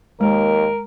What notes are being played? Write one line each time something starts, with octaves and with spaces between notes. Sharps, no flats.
D#2 G#3 A#4